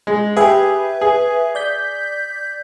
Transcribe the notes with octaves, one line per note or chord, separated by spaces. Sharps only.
G#3
G4 G#4 B4 E5
G#4
D5 G6 B6